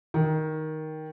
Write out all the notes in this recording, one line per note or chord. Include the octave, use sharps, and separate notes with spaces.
D#3